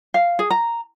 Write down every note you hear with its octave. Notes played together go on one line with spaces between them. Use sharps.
F5
G#4
A#5